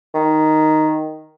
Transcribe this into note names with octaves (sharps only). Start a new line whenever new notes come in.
D#3